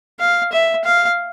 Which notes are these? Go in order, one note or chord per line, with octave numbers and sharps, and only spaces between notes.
F5
E5
F5